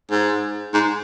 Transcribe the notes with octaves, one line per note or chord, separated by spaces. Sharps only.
G#2
G#2